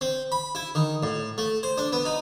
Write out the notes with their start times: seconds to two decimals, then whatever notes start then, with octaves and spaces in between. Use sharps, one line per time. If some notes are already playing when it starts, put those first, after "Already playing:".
0.01 C4
0.32 B5
0.55 E4
0.75 D#3
1.03 A2
1.38 A3
1.63 C5
1.78 D4
1.93 B3
2.05 D#4